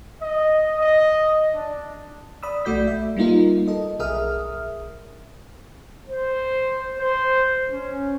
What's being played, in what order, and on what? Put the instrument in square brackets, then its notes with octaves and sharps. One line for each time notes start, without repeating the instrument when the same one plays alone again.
[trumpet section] D#5
D#5
D4
[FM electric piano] D5 B5 D#6 E6
B1 A3 F#4 D5 G6 B6
E5
G3 A#3 D#4 F4 A#4
A4 D#5
B1 G#4 A#4 E5 D#6 F6
[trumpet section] C5
C5
C#4